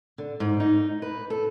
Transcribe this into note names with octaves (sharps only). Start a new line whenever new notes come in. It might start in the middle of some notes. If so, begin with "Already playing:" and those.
D3
G#2
D#4
B4
A4